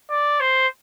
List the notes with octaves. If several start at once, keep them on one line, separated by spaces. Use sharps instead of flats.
D5
C5